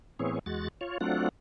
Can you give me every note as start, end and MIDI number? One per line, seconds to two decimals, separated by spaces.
0.19 0.39 45
0.19 0.39 52
0.19 0.39 59
0.19 0.39 60
0.19 0.39 68
0.19 0.39 73
0.46 0.68 40
0.46 0.68 56
0.46 0.68 66
0.46 0.68 93
0.81 0.98 65
0.81 0.98 73
1.01 1.29 54
1.01 1.29 57
1.01 1.29 60
1.01 1.29 62
1.01 1.29 65
1.01 1.29 78